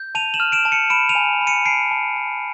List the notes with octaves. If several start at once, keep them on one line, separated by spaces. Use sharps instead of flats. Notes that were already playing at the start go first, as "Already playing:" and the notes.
Already playing: G6
A5 D#7 F7
E7 F#7
F6
D7 E7
A5
C#7 D#7
B5 D7 E7
D#7 F7
G#5
B5
C#7 D#7
A5 C7 D7
A5
A5